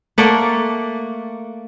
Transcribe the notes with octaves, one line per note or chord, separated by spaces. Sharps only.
A3 A#3 D5 F#5